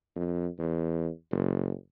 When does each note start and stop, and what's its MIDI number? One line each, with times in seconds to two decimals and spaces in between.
0.16 0.48 41
0.59 1.09 40
1.31 1.73 30